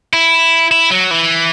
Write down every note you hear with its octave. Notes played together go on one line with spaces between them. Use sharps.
E4
E4
F#3
E3